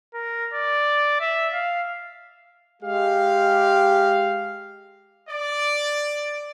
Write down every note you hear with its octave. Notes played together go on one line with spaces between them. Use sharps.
A#4
D5
E5
F5
G#3 G4 F5
D5